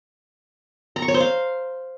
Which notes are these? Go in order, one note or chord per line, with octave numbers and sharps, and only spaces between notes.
A#5
C#6
C#5
C5
F5